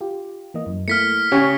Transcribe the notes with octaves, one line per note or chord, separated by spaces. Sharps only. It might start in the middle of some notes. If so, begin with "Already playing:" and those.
F4 G4
E3 A#3 D#5
F#2
A3 A#3 E4 F6 B6 C#7
C#3 G4 C#5 G#5